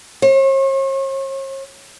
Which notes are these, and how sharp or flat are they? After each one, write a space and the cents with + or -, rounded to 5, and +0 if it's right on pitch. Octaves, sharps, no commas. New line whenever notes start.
C#5 -45